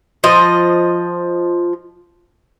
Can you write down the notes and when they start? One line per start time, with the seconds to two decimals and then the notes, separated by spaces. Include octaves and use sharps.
0.24 F3 D#5